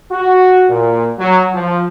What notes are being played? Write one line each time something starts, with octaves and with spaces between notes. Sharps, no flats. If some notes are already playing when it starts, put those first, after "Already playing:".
F#4
A#2
F#3
F3